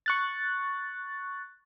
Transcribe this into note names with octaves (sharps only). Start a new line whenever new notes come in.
C#6 F#6 A6